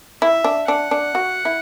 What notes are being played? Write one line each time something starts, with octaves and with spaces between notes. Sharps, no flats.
E4 E5
D4
D4 F#5
D4
F#4
E4